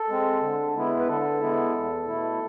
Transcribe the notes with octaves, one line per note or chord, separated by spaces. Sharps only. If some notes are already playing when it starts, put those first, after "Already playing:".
Already playing: A4
G#3 C4
D3
G#3 B3 E4
B4
D3 A4
G#3 B3 E4
E2
B2 A3 E4